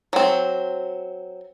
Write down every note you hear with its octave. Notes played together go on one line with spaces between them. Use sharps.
F#3 C4